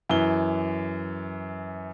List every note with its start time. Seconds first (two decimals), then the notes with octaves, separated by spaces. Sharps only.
0.10 F#2 E3 G7